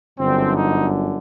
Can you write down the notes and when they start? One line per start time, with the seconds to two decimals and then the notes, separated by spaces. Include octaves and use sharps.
0.19 G1 F#2 D3 C4
0.56 D#4